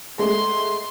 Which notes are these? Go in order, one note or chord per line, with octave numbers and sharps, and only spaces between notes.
G#3 A3 C6